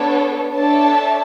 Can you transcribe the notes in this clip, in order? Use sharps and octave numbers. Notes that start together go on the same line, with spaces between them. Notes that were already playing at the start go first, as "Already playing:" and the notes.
Already playing: B3 D4 A4 C#5
D4 A4 C#5 E5 A5